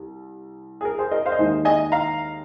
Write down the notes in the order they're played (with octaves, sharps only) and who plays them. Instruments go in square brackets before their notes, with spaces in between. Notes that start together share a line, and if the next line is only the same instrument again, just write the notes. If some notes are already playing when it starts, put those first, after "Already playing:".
Already playing: [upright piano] C2
G#4
A#4
G#4 C5
A#4 D#5
C5 F5
D#5
D#2 D#3 G#3 G#4 C5
D#5 G#5
F5 A#5